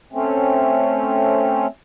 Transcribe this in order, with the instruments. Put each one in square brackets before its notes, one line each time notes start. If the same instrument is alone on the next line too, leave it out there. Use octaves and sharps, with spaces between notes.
[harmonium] A3 C4 C#4